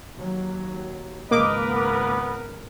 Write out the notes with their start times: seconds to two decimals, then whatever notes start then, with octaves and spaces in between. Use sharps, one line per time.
0.16 D#2 F#3
1.31 G#1 C#2 A#3 A#4 B4 D#5 D6
1.70 B3